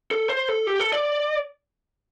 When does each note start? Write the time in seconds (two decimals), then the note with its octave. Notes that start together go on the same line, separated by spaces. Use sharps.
0.11 A4
0.30 C5
0.49 A4
0.67 G4
0.79 A4
0.92 D5